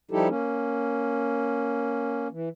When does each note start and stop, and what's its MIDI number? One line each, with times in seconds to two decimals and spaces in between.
0.11 0.28 53
0.11 0.28 55
0.11 0.28 63
0.11 0.28 64
0.11 0.28 67
0.11 0.28 69
0.28 2.28 58
0.28 2.28 61
2.32 2.49 52